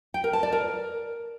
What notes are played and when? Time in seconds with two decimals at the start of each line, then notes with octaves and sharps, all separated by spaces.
0.14 G5
0.24 A#4
0.33 A5
0.43 D5
0.52 A#4